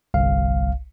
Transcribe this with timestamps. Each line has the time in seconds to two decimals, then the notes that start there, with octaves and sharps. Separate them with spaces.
0.14 G1 C2 F5